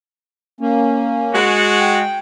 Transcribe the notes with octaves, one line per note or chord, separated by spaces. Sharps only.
A#3 C#4
G#3 F#4
G5